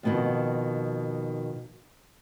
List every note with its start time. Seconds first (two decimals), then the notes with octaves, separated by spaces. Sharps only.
0.03 F2 B2 D#3